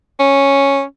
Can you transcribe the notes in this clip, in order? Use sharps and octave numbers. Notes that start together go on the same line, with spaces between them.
C#4